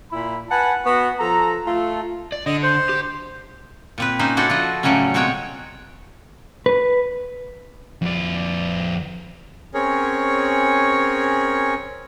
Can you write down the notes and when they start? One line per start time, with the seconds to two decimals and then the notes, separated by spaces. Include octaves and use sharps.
0.11 A#2 E4 B5
0.50 B4 F#5 G#5 A5
0.85 B3 F#4
1.19 F3 A4 A#5
1.66 A3 F4 A4
2.32 D5
2.46 D3 D#5
2.63 C5
2.89 G4
3.98 A#2 C4 B4
4.19 A#3 C#4 D#4 C5
4.37 D4 E4 F#4 A4 C5
4.50 F3 F#4 D#5
4.83 A2 C#3 F#3 G3 A3 C#4
5.14 B2 G#3 C4 F#4 C#5 G5
6.66 B4
8.02 F2 D5
9.74 C4 C#4 G#4 A#4 C#5